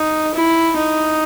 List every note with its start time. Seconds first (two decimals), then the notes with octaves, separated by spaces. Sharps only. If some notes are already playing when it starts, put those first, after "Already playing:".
Already playing: D#4
0.34 E4
0.76 D#4